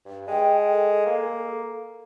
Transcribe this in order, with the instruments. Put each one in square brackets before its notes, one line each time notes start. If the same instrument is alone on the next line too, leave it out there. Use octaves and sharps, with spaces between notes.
[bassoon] G2
[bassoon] G#3 [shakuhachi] G5
[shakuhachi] A4
[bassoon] A#3